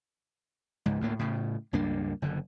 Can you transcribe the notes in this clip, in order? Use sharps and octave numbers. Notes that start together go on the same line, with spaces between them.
C#2 G#2
D2 A2 A#3
A2 C#3
C#2 G2 A#3 D4
F#1 D3